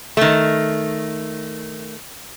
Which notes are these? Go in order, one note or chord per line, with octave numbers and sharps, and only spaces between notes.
D#3 A3